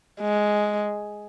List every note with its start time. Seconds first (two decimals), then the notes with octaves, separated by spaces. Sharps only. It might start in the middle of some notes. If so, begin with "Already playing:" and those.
0.21 G#3